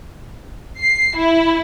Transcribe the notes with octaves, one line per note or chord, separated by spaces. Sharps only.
C7
E4